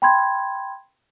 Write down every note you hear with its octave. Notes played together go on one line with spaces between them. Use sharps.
G5 B5 C6 G#6